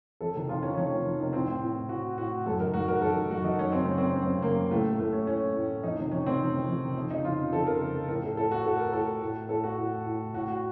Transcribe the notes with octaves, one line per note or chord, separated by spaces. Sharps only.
F2 A4
C3 D#3
F2 F4
C3 D#3 C#4
F2 C#4
C3 D#3
F2
C3 D#3
A2 C4
C4
A2
A2 F#4
A2 F#4
F#2 A4
D#3 A#4
F#2 F#4
D#3 A#4
F#2 A4
D#3
F#2 F#4
D#3 D#4
F#2 C#4
C#3 C4
F#2 C#4
C#3 C4
F#2 C#4
C4
C#3
F#2 A#3
C#3
A2 A3
A2 A3
C#4
A2 C#4
A2
F2 D#4
C3 D#3
F2 C#4
C3 D#3 C4
F2
C3 D#3
F2
C3 D#3
F2
C#3 D#4
F2 F4
C#3
F2 A4
C#3 A#4
F2
C#3
A2 A#4
A4
A2 A4
F#4
A2 A4
A#4
A2 A4
A2
A2 A4
F#4
A2
A2
A2 F#4
F#4